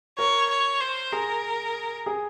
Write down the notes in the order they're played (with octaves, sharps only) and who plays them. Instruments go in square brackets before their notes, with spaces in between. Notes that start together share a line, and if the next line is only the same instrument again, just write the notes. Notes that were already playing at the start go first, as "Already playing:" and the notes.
[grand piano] A#4 [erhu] C#5
[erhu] C#5
C5
[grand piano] G#4 [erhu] A#4
[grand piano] G#4